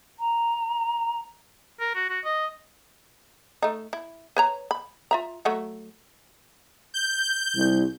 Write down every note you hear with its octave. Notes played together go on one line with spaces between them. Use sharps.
A#5
A#4
F#4
F#4
D#5
A3 D#4
E4
B4 C#5 A#5
B5
F4 E5 A#5
F#3 A3 F#4
G6
C2